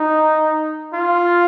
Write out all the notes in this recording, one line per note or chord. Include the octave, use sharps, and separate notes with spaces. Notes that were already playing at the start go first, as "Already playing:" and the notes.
Already playing: D#4
F4